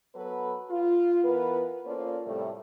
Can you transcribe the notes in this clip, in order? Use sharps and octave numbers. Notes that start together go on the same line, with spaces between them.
F#3 B3 A4 B4
F4
E3 B3 A#4 B4
A#3 C#4 F4 A4 C5 D5
A2 C3 G3 A3